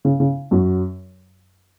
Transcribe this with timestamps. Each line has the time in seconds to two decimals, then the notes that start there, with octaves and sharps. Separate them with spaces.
0.05 C#3
0.20 C#3
0.51 F#2 F#3